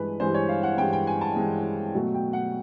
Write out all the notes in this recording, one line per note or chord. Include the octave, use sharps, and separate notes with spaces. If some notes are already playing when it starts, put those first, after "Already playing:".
Already playing: G2 E3 G#3 B4
G2 E3 G#3 C5
C#5
F5
F#5
G2 E3 G#3 G5
G5
G#5
A5
G2 E3 G#3
B2 F#3 A3
G5
F#5